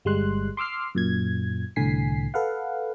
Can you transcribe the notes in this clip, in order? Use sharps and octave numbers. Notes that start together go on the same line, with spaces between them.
G1 G3 G#3 C6 F#6
C6 D6 E6 F6 C7
F#2 A#2 G#6
C2 A2 D3 G#5 B6 C7
A4 B4 F5 F#5